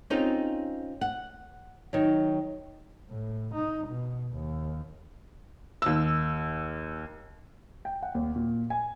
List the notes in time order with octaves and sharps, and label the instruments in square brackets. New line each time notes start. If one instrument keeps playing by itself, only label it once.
[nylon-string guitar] C4 C#4 D#4 F4 G#4
F#5
D#3 F#3
[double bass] A2
D#4
B2
D#2
[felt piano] D#2 E6
[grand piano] G5
F#5
D#2
A#2
G#5